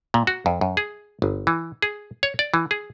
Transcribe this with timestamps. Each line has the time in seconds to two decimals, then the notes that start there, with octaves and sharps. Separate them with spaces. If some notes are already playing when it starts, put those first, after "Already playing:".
0.14 A#2
0.27 F#4
0.46 F2
0.61 F#2
0.77 G#4
1.22 G1
1.47 E3
1.82 G#4
2.23 C#5
2.39 D5
2.54 E3
2.71 G#4